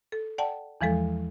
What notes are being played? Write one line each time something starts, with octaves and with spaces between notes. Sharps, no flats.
A4
D5 F#5 G5 A5
E2 E3 F3 G#3 A4